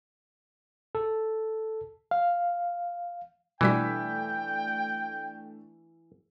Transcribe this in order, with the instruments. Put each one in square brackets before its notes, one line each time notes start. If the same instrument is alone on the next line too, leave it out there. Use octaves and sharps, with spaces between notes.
[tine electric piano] A4
[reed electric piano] F5
[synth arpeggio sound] B2 G3 F#4 [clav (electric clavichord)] E3 [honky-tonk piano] A3 D4 B6 [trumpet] G5